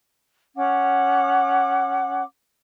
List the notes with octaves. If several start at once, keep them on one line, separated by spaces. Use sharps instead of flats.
C#4 F#5 D6